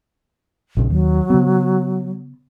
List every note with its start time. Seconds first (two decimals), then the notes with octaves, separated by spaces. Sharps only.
0.77 A#1 C#3
0.90 D#2 F#3
1.30 C#3 B3